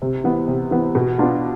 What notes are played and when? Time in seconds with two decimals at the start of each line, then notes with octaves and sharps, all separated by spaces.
0.02 C3
0.24 E3 B3
0.48 C3
0.71 E3 B3
0.95 B2
1.18 B3 D4 F4